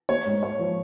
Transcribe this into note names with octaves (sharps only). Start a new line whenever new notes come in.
A#3 C#5
G#2
G#2 C#5
F3